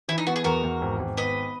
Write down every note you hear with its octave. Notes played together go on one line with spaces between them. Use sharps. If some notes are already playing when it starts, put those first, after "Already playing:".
E3 E4
D#4
B3 F#4
G#4
E2 F#4 A#4
E2
G#1
G#1
B3 B4 D#5